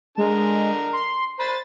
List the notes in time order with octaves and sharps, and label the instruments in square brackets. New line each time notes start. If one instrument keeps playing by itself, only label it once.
[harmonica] D3 A#4 A#5 [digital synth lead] G#3
[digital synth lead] C6
[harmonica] C5 B5 [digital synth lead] A6